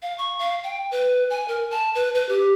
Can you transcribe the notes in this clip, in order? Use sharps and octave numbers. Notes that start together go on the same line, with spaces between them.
F5
C#6
F5
G5
B4
G#5
A#4
A5
B4
B4
G4